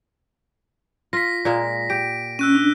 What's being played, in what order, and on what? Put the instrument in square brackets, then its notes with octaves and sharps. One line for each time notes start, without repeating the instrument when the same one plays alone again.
[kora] F4 [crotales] A#6 B6
[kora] A#2 G#3 A#3
[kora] G4 [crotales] D7
[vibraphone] C#4 [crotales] E6 F#6 D#7
[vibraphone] D4